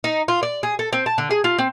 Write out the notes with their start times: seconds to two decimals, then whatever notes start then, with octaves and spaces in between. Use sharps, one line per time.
0.04 D#4
0.28 F4
0.43 D5
0.63 G#4
0.79 A4
0.93 C4
1.06 A5
1.18 D3
1.31 G#4
1.44 F4
1.58 C4